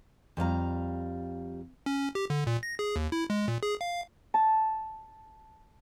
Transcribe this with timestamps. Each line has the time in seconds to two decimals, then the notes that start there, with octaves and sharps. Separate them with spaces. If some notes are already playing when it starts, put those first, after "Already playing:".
0.37 F2 G3 F5 A#5
1.86 C#4
2.15 G4
2.30 D3
2.47 A#2
2.63 A#6
2.79 G#4
2.96 D#2
3.12 E4
3.30 G#3
3.48 A#2
3.63 G#4
3.81 F5
4.34 A5